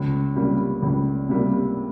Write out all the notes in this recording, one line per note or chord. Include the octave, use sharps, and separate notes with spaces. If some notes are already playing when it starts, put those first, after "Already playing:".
Already playing: C#2
C3 G3 A#3
C#2
C3 G3 A#3